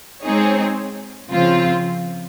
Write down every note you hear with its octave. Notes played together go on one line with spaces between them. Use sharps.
G#3 C4 D#4 G#4 C#5
C#3 F3 C4 F4